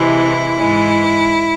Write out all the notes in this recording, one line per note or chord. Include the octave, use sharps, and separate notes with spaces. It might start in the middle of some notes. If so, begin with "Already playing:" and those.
Already playing: C3 E3 G#3 E4
G#2 E3 G#3